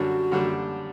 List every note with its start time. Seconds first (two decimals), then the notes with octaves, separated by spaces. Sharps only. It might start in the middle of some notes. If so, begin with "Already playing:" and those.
Already playing: F#2 D3 G3 D4 F#4
0.32 F#2 D3 G3 D4